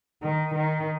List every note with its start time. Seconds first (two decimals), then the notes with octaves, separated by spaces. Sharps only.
0.22 D#3
0.55 D#3